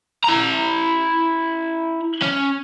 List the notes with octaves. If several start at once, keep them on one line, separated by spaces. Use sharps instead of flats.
E4 A#5
C#4